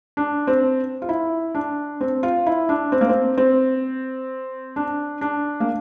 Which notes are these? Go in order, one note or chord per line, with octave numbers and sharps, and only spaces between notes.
D4
C4
F4
E4
D4
C4
F4
E4
D4
C4
A#3
C4
C4
D4
D4
A#3